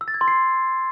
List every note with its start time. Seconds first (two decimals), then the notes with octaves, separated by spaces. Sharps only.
0.01 E6
0.08 A6
0.14 G#6
0.21 C6
0.28 C7